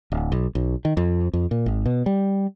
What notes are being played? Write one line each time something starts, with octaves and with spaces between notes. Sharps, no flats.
D1
B1
B1
D#3
F2
F2
A#2
G#1
B2
G3